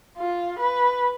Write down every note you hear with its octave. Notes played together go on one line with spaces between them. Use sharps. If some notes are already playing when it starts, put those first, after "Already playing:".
F4
B4